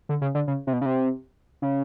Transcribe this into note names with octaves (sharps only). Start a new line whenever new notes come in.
D3
C#3
D3
C#3
C3
B2
C#3
C3
C#3